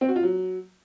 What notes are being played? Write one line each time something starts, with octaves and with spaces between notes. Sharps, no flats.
C4
F#4
F4
F#3